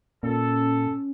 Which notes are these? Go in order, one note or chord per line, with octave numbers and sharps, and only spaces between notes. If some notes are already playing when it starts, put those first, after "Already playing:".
A#2 C#4 A4